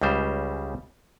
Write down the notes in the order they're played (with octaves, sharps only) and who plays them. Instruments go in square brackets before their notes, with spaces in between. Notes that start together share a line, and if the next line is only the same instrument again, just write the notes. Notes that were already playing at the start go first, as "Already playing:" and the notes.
[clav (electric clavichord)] C#2 C#3 G3 C5